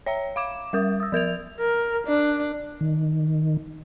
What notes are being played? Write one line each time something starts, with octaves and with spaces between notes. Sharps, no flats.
C#5 E5 A#5
F5 D6 E7
G3 A#4 D#6
D#6 E6
F3 A#4 G#6 F7
A#4
D4
D#3